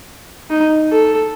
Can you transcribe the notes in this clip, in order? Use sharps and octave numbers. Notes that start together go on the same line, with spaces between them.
D#4
A4